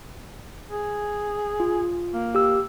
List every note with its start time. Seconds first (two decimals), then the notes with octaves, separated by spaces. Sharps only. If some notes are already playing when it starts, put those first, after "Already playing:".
0.71 G#4
1.60 F4
2.14 A#3
2.35 G4 E6